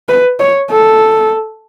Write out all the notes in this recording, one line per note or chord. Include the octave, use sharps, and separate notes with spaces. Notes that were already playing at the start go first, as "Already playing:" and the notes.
B4
C#5
A4